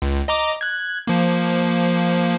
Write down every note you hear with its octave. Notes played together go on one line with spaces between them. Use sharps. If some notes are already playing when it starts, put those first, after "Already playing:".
C#2
D#5 A#5 D6
F#6 G#6
F3 A#3